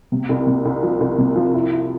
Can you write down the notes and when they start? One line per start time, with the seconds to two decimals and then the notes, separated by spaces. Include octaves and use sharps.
0.12 C3
0.29 C2
0.47 C3
0.65 C2
0.83 F3
1.00 C2
1.18 C3
1.36 F3
1.54 E4
1.71 E4